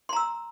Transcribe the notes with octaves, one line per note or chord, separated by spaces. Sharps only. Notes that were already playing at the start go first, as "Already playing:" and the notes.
A#5 C6 E6